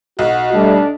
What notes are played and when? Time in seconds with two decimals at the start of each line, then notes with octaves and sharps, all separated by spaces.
0.19 B1 F#4
0.53 G3 A3 D4